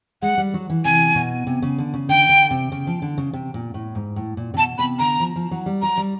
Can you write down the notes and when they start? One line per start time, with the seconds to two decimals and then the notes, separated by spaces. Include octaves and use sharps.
0.22 G#3 F#5
0.38 G3
0.54 F#3
0.70 E3
0.85 C3 G#5
1.15 B2
1.47 C3
1.62 C#3
1.78 D3
1.94 C#3
2.09 D3 G5
2.29 D3
2.51 C3
2.72 C#3
2.87 F3
3.02 D3
3.18 C#3
3.33 C3
3.54 A#2
3.74 A2
3.95 G#2
4.16 A2
4.37 A#2
4.54 C3
4.57 B2 A5
4.78 C3 B5
4.99 D3 A#5
5.20 F3
5.36 F3
5.51 F#3
5.66 G3
5.82 F#3 A#5
5.97 G3